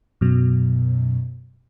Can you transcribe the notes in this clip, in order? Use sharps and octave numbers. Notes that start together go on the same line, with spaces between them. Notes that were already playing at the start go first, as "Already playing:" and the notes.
F#2 B2 F#3